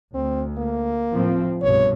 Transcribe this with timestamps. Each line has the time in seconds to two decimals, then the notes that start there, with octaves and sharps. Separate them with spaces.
0.14 D2 C4
0.57 A#3
1.10 A2 F3 C4
1.62 C2 G2 B2 C#5